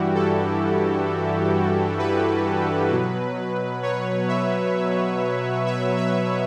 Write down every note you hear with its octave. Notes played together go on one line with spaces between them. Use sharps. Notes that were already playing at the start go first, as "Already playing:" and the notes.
Already playing: G2 E3 G3 E4 F#4 G4
A4
B4
B2 F#3
C#5
E5
E5
E5